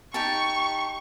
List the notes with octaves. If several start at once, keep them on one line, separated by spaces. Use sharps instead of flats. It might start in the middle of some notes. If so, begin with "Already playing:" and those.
D#4 G4 A5 C#6